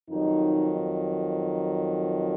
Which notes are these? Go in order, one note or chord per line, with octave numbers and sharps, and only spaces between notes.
F2 D#3 F#3 D#4